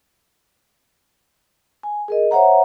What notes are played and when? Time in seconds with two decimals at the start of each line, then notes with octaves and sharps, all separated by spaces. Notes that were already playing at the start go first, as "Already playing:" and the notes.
1.83 G#5
2.08 G#4 A#4 D#5
2.31 C5 C#5 E5 F#5 A#5